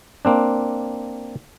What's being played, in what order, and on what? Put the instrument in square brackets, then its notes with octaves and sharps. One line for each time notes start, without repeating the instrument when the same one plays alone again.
[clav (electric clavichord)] A#3 C4 D4